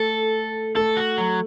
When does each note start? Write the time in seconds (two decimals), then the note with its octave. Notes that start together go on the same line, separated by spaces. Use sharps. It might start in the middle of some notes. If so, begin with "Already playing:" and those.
Already playing: A3 A4
0.76 A3 A4
0.97 F#4
1.18 F#3